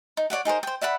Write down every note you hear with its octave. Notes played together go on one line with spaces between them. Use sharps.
D#4
C#5 D5 E5 F#5
D#4 G#4 A#4 C5
C5 G5
D5 E5 F#5 B5